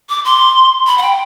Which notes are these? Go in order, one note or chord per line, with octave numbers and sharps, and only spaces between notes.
D6
C6
B5
F#5
G5